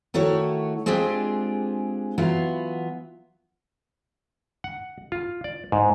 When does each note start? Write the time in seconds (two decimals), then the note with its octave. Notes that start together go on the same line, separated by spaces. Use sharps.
0.14 D#3 A3 E4 F#4 C#5
0.86 G#3 C4 D4 F4 G4 G#4
2.18 E3 F#3 B3 F4 F5
4.64 F#5
5.12 F4
5.44 D5
5.72 G#2